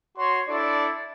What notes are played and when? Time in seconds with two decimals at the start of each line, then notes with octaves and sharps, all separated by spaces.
0.17 F#4 C#5 C6
0.48 D4 E4 A4 D5